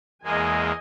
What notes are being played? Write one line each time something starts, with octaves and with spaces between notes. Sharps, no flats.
E2 G#3 A#3 D#5 G#5